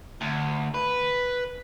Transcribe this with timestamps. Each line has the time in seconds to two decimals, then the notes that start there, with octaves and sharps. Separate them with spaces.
0.21 D2
0.74 B4